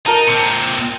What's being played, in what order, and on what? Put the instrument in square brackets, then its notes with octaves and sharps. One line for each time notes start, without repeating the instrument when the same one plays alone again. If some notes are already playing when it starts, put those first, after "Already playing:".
[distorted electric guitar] D#4 [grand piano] A#4 A5
[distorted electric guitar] A#2 C4 [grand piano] C#7